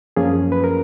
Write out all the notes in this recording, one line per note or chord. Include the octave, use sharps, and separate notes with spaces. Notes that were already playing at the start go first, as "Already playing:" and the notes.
F#2 F3 A#3 C#4 F4 G#4
B4
A#4